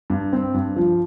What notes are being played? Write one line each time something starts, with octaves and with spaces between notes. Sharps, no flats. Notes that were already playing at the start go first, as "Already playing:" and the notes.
G2
C4
G2
F3